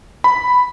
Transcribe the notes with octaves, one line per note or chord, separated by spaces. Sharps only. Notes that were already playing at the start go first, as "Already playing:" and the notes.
B5